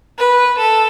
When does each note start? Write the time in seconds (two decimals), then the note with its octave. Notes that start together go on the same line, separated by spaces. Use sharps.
0.17 B4
0.58 A4